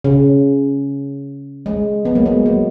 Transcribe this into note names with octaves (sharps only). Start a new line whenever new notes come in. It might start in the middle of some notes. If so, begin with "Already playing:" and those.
C#3
G#3
G#3 B3
F#3 A#3
G#3 B3
F#3 A#3